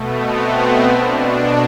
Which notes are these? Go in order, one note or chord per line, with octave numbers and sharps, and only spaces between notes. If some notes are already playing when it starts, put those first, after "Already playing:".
Already playing: B2 A3 B3
C4
B2 D4